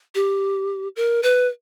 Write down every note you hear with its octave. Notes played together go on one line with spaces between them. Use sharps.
G4
A#4
B4